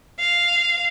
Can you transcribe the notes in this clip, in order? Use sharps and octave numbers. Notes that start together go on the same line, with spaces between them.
F5